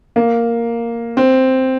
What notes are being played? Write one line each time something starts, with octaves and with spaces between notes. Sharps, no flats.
A#3
C4